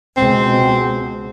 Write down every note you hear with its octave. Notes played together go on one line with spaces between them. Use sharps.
C#2 B2 G#3 C4